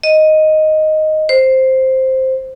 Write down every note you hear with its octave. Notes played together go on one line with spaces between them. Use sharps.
D#5
C5